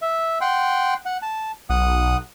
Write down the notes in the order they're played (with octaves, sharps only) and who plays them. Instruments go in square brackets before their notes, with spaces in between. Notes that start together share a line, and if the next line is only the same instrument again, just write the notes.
[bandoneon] E5
F#5 G5 C6
F#5
A5
[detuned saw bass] B1 [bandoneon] F#5 D#6